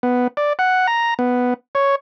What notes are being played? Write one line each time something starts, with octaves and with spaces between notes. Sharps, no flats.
B3
D5
F#5
A#5
B3
C#5